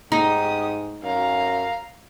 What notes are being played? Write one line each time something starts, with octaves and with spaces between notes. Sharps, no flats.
G#2 D#4 G4 D#6
F#2 F5 A#5